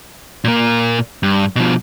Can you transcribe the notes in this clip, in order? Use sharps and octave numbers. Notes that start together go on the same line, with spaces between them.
A#2 A#3
G2
B2 F3